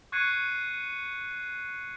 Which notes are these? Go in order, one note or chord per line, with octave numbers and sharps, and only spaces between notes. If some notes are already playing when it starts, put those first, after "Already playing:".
C#6 F#6 G#6 C7 C#7 D#7